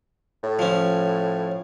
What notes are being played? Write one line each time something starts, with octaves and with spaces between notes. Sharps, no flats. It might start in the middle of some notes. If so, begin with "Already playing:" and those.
A2
F3 C#4